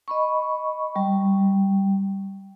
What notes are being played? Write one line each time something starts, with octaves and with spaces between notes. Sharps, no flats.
D#5 B5 C#6
G3